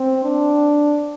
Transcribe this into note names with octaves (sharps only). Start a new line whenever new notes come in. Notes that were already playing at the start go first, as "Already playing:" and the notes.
Already playing: C4
D4